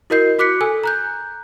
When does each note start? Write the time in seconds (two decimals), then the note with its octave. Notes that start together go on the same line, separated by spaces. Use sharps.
0.10 E4 F#4 A#4 D#5 G6 C7
0.39 F#4 D6 F#6 B6 C#7
0.61 A4 G#5 E6
0.84 A#5 F#6 G6